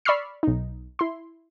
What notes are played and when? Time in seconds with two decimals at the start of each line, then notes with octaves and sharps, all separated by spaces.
0.05 D5 B5 C#6 E6 F6 C7
0.43 B1 D#4
0.99 E4 C6